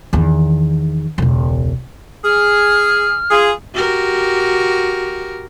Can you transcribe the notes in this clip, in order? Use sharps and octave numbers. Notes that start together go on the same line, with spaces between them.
E2 D#3
E1 C#2
G#4 F6
F4 G#4
F#4 G4 A#4